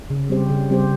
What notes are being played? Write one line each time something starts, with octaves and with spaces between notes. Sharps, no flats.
C#3
G3 C4 G4 C5
C#3
G3 C4 G4 C5